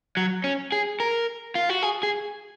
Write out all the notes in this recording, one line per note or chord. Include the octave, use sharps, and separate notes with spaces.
F#3
C#4
G#4
A#4
F4
F#4
G#4
G#4